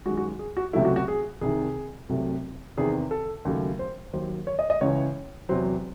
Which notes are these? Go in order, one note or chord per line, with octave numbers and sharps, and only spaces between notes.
F#2 D#3 G#3 F#4
F#4
G#4
F#4
C#2 C3 F#3 A3 E4
F#4
F#4
G#4
C2 C3 D#3 G#4
C2 C3 F#3 A3
E2 C3 D#3 G#4
A4
D#2 C#3 F#3 A3
C5
D#2 D#3 F#3 C5
C#5
D#5
D#5
C#2 C#3 E3 C#5
E2 C3 F#3 C5